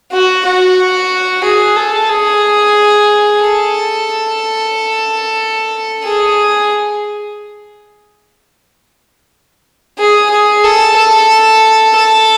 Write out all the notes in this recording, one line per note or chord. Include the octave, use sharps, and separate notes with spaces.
F#4
F#4
G#4
A4
G#4
A4
G#4
G#4
G#4
A4
A4
A4